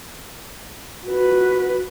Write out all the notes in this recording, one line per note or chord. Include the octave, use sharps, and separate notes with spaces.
F#4 B4